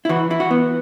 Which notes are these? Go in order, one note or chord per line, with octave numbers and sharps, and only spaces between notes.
E4
E3 F#4
E3 E4
F#4
B3